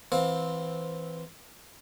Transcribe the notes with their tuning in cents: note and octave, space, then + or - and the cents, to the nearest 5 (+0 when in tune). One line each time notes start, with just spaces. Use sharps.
E3 +0 C4 +0 F5 +30